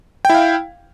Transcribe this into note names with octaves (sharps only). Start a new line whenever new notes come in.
E4 F5 G5